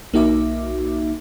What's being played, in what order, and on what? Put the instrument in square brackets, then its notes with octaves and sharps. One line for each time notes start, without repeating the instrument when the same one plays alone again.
[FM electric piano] B1 A#3 D#4 F#4 E5 D6